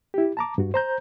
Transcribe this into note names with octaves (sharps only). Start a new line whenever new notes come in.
E4 G4
A5 A#5 D6
G2 F#4
C5 A#5 G6